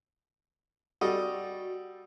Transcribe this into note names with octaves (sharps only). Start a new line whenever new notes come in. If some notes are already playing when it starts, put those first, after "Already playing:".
G3 F#4 A4 D#5